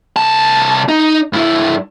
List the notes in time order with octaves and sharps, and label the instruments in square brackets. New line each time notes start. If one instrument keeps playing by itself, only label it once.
[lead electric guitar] C2 A5
D#4
G2 E4